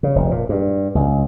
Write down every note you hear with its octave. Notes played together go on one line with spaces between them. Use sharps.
C#3
F1
A#2
G2
C#2